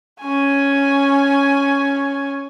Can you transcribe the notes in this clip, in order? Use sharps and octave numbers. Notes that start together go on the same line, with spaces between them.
C#4 G#5